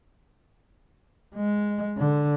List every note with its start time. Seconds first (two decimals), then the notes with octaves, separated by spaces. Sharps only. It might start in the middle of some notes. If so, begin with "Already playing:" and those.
1.35 G#3
1.98 D3